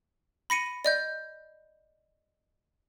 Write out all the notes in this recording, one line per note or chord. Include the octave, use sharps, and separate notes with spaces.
B5 A#6 C#7 D#7
D5 D#5 G6